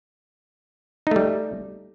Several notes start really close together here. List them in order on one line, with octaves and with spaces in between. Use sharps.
D#4 A3 G3